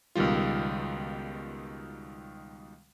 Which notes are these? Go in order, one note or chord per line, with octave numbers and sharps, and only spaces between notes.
C#2 B2 D#3 G3 F4